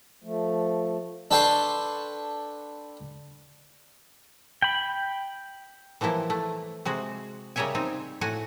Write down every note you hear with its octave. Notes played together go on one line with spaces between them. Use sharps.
F3 A3
D4 A4 B4 G5 C6 C#6
G5 B5
E3 F3 G3 A#3 E4
A3
C3 G#3 F#4
C#3 G3 A#4 C#5 E5 G#5
C4 D#4
A2 F#4 F#5 G#5